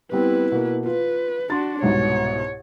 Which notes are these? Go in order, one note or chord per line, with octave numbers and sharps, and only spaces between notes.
G3 B3 C4 E4 B4
B2 A#3
F4 B4
D4 F#4 C6 A6
C2 G#2 B2 C#5